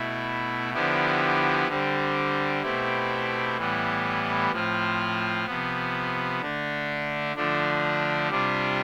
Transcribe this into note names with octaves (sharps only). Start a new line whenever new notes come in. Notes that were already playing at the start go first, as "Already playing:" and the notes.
Already playing: B2 A3 E4
D3 F3 B3 E4 G4
D3 G3 C4
B2 A3 C4 E4 G4
A2 E3 G3 B3
A2 F3 C4 F4
C3 F3 B3
D3 A3 D4
D3 F3 A3 D4
C3 G3 D4 F4